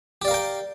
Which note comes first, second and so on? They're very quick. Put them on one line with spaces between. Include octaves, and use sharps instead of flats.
G4 D5 F5 A#4 G5